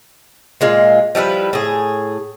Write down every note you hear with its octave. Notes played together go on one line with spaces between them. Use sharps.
A#2 G#3 F4
F3 G3 E4 B4
A2 G#4